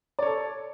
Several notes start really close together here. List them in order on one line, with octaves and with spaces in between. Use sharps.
D5 C#5 A4